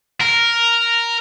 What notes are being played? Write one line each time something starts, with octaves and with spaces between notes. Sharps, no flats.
A#4